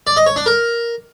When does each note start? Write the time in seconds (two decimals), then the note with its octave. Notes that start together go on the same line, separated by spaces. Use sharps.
0.07 D5
0.17 D#5
0.26 C#5
0.36 D4
0.46 A#4